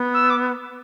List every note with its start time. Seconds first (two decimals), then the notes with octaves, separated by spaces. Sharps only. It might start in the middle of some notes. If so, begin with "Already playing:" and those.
Already playing: B3
0.14 E6
0.30 D6